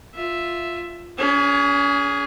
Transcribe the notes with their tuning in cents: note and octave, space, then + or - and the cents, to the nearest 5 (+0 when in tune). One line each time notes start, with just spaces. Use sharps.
F4 +0 E5 +0
C#4 +40 G#4 +0